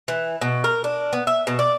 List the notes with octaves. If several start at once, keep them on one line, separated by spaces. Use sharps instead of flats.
E3
B2
A#4
D4
B3
E5
B2
D5